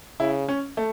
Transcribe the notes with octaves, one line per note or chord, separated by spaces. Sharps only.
C#3 E4
C#4
A3